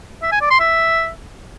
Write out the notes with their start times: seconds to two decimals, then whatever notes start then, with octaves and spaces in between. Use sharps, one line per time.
0.22 E5
0.32 G#5
0.41 D5
0.50 C6
0.60 E5